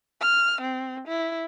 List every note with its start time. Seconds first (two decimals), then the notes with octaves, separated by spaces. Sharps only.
0.21 F6
0.61 C4
1.07 E4